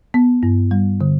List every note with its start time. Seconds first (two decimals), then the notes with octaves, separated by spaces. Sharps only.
0.14 B3
0.43 G2
0.71 G3
1.01 D3